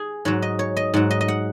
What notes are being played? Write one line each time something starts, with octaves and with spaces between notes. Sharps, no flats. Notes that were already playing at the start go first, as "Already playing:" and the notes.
Already playing: G#4
G#2 F#3 C#5
D#5
C#5
D#5
G#2 F#3 F#5
D#5
D#5
F#5